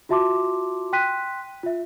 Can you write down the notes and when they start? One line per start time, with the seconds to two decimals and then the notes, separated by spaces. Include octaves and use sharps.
0.09 F4 F#4 E5 A5 C6 D6
0.93 G5 C6 F#6 B6 D#7
1.63 F4 E5